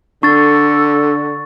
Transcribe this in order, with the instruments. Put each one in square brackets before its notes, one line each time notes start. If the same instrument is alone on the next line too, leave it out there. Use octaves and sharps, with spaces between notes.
[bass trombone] D3 [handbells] D4 [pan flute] A4 [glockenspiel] C#6 A6